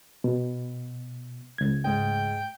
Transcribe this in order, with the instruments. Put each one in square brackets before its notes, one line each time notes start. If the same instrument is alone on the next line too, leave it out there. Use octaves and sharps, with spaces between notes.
[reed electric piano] B2
C#2 G#6
[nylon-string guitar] G#2 D#5 [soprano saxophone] G5